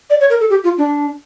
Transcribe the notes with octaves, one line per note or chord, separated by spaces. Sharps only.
D5
C#5
A#4
A4
G4
F4
D4